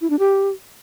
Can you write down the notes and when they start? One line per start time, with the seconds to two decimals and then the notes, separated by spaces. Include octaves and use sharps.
0.01 E4
0.10 D4
0.19 G4